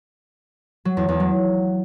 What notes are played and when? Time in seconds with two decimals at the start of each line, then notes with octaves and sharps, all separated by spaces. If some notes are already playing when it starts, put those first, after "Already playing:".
0.85 F#3
0.97 E2
1.08 E2
1.20 F#3